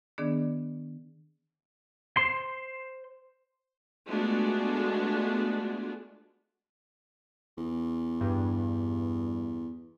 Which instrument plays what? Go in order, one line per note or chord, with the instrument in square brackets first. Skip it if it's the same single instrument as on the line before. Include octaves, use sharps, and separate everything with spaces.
[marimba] D#3 B3 D4 G#4 D5
[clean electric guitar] C5 C6
[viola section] G#3 A3 B3 D4 F4 F#4
[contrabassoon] E2
[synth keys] G2